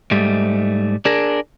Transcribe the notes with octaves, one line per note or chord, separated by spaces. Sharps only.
G#2 G3 A3
D4 G#4 A#4